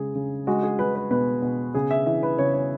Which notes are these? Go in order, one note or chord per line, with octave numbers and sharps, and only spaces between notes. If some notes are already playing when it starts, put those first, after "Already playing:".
Already playing: C#3 G#3 G#4
C#3
G#3 F#4
G#4
G#3 B4
B4
B2 B4
B2
C#3 G#4
E5
E3 E5
B4
C#3 C#5
C#5